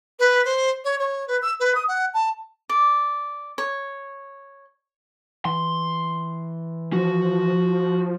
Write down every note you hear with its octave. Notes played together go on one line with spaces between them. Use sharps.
B4
C5
C#5
C#5
B4
E6
B4
D#6
F#5
A5
D5
C#5
E3 C6
F3 F#4